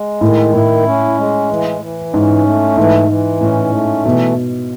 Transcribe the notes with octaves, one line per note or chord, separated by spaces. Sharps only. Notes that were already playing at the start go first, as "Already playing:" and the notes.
Already playing: G#3
A2 D#3
A2 E4
C#4
G#3
E3
E3
G#2 C#4
A3
G#2 E3
E3
A2 C#4
A3
B2 E3